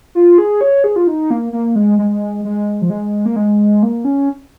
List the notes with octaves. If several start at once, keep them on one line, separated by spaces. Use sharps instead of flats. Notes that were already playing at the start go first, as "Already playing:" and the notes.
F4
G#4
C#5
G#4
F4
D#4
A#3
A#3
G#3
G#3
G#3
F3
G#3
A#3
G#3
A#3
C#4